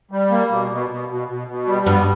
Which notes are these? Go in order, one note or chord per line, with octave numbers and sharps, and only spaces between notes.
G3
A#3
B2
B2
B2
B2
B2
B2
G3
G2 B3